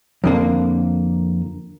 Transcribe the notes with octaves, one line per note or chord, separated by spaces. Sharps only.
F2 D3 A#3